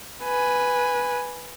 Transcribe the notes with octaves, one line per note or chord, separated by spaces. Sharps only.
B4 G#5